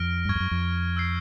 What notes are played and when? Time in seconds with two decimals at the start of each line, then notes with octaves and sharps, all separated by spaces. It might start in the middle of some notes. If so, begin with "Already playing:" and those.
Already playing: F2 F6 A#6 D7
0.25 G2
0.29 F#2 C#6 F6 G#6
0.35 F2
0.40 F#2
0.51 F2
0.96 E6 G6 C7